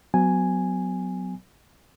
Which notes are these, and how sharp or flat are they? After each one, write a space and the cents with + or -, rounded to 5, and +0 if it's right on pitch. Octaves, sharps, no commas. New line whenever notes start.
F#3 +0 B3 +25 G#5 +0